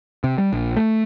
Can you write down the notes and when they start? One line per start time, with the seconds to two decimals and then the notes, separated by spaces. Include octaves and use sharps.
0.24 C3
0.38 G3
0.53 A#1
0.77 A3